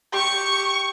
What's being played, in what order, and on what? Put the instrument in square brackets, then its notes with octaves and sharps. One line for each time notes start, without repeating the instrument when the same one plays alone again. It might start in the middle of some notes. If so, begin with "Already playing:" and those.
[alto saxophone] G4 [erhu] C#6